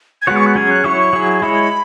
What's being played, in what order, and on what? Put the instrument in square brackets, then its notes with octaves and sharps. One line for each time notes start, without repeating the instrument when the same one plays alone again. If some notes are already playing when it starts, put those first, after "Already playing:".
[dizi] G#6
[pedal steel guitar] G#3 B3 F#4 C#5 [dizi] F#6
[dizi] C#6
F#6
[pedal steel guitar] F#3 C#4 G#4 C#5 [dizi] G#6
[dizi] F#6
[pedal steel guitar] F#3 E4 C#5 [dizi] C#6
[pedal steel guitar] F#3 E4 G#4
[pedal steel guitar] G#3 E4 C#5 [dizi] B5